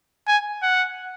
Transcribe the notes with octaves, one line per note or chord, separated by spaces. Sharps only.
G#5
F#5